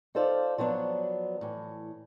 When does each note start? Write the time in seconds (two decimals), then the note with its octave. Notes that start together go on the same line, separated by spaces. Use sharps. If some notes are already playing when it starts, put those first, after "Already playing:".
0.15 D#4 F4 A4 C5 D5 F5
0.58 F3 F#3 B3 D4
1.41 A2 E3